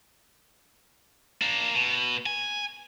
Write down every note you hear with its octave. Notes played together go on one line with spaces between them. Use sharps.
A#3 D4
B2
G#5